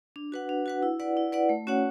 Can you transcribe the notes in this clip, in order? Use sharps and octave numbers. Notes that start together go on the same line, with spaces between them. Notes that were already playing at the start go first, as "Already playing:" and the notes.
D4
F#4 B4 F#5
D4
F#4 B4 F#5
E4
B4 D5 F#5
E4
B4 D5 F#5
A3
C#4 F#4 C#5 F#5